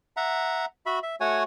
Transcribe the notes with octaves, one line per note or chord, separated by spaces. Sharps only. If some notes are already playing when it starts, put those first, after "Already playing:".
E5 F#5 A#5
F#4 E5 B5
E5
A3 F#4 C#5 F#5 G#5